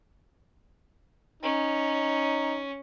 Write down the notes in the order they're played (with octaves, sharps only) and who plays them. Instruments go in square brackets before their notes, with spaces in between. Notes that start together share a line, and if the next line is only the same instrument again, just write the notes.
[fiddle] C#4 [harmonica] D#4